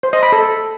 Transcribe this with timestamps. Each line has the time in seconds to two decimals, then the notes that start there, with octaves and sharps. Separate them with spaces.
0.03 C5
0.13 D#5
0.23 B5
0.32 A4